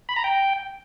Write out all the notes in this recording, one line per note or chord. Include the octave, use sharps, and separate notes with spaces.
B5
A#5
G5